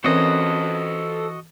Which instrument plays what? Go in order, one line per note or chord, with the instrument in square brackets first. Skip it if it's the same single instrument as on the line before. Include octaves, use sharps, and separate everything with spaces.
[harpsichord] E3 [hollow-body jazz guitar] C4 C#4 A#4 [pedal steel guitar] F#4 D#5 [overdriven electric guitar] A4 C5